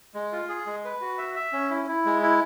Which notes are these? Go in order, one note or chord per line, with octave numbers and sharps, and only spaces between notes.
G#3
F4
G#4
G#3
B4
F#4
E5
E5
C#4
E4
E4
G#3
E4